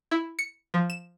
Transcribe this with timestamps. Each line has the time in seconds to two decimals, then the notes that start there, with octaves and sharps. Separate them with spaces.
0.11 E4
0.39 C#7
0.74 F3
0.90 E7